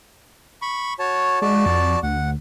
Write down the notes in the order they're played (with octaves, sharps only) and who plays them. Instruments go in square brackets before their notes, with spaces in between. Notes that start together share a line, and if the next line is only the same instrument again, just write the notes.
[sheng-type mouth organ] B5 C#6
F#4 C#5 A5
[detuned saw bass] G#3 [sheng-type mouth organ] F#4 D5 A5
[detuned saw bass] F2
[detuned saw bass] D2 [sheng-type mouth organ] F#5